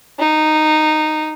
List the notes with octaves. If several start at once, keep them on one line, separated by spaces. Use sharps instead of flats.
D#4